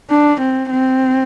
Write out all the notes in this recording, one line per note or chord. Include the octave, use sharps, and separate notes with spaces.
D4
C4
C4